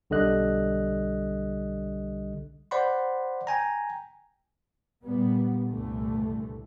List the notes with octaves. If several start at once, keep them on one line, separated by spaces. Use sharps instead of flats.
B1 D3 G3 D#5 F#6
C5 D5 F#5 B5 C6
G5 G#5 A#5
A#2 G3 B3
C2 G2 A#2 D3 E3 A3